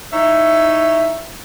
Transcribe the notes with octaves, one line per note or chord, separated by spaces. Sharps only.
D#4 E4 C#5 E5